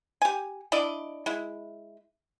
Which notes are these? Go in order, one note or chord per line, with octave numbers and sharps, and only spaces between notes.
G4 G#5
D4 E4 D5 D#5
G#3 E4